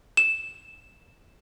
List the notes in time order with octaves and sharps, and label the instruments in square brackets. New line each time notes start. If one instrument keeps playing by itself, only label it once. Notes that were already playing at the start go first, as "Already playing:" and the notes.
[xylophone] E7